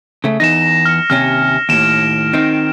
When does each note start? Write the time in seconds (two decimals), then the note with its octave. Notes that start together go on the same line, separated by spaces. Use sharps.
0.24 C#3 A3
0.40 E2 D#4 A#6 E7
0.86 F6 C#7
1.10 D#2 C3 C#4 F6
1.69 D#2 A2 D7 E7
2.33 D#3 C4 D#4